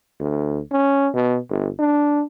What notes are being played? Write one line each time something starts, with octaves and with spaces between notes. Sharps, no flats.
D2
C#4
B2
G1
D4